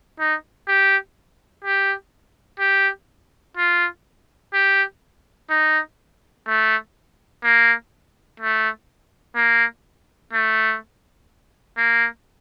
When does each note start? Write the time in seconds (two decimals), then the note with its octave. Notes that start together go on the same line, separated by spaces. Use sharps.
0.20 D#4
0.68 G4
1.64 G4
2.60 G4
3.57 F4
4.54 G4
5.50 D#4
6.47 A3
7.44 A#3
8.40 A3
9.36 A#3
10.33 A3
11.78 A#3